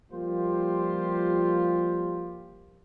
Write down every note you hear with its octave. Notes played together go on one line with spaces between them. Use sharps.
F3 G3 A#3 F4 G4 C5